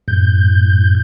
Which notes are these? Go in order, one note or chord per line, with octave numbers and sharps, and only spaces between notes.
F#2 A2 G6